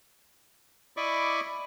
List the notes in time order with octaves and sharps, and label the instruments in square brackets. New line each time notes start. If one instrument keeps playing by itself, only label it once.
[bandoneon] E4 D5 D#5 B5 C#6 D6